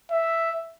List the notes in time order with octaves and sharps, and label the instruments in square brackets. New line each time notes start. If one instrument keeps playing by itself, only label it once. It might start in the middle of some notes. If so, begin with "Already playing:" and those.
[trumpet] E5